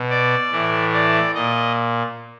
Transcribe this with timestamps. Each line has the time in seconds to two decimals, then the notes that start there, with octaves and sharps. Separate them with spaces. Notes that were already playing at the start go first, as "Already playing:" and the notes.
Already playing: B2
0.10 D5
0.52 A2 E3
0.93 D5
1.35 A#2 D#5